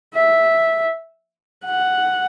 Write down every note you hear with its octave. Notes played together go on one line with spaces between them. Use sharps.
E5
F#5